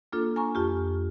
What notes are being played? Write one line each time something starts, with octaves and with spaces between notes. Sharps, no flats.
A#3 D4 F4 A4
G#5 A#5 C#6
F2 F4 G4